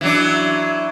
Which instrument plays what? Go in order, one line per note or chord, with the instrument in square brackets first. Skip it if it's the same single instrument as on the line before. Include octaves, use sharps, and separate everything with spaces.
[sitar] E3 F#3 D4